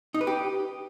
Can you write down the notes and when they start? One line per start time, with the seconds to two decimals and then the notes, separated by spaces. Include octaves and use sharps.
0.14 D#4
0.21 B4
0.27 G4